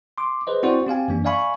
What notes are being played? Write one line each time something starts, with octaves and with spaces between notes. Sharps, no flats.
C6 D6
G#4 B4 C5 D#5
C4 E4 F#4 C5 D5
C4 G4 F5 G#5
F#2 E3 A#3 D4
D5 E5 F5 G#5 B5 C#6